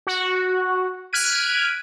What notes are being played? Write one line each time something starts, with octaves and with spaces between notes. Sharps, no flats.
F#4
F6 F#6 G#6 B6 D7 D#7